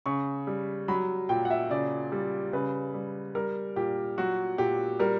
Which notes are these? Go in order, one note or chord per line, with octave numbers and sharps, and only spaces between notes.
C#3 C#6
G3
F#3 B5
A#2 G5
F#5
E5
C#3 D5
G3
C#3 B4
G3
G3 A#4
A#2 G4
F#3 F#4
A#2 G4
G3 A#4